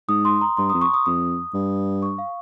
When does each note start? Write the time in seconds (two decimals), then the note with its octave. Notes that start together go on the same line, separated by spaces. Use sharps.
0.08 G#2 D#6
0.25 C6
0.41 A#5
0.57 G2 C6
0.70 F2 D#6
0.81 C#6
0.94 D#6
1.06 F2 D#6
1.54 G2
2.02 C#6
2.18 F5